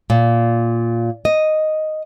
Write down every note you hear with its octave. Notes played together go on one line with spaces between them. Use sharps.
A#2
D#5